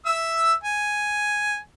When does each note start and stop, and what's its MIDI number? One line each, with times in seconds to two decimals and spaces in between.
0.06 0.54 76
0.06 0.54 88
0.64 1.58 80